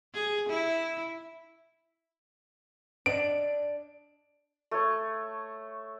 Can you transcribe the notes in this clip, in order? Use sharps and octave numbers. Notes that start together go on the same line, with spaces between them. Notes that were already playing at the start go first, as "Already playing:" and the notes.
G#4
E4
D4 D5 D#5 D7
A3 C#5